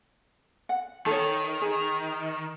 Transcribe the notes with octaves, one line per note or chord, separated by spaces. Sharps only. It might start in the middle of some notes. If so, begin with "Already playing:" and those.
F#5
D#3 A4 C#5
G#4